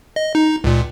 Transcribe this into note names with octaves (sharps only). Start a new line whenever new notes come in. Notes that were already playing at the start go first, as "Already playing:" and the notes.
D#5
D#4
C#2 A#2